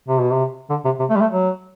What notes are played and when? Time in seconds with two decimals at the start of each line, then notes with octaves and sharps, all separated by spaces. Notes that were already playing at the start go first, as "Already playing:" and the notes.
0.08 C3
0.20 B2
0.32 C3
0.70 D3
0.85 C3
1.00 C3
1.10 A3
1.16 G3
1.21 A3
1.31 F#3